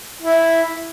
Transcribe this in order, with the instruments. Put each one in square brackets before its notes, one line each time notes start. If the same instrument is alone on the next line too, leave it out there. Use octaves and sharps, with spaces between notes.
[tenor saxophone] E4